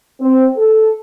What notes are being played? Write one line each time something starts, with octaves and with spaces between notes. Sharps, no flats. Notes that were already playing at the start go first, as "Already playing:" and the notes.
C4
A4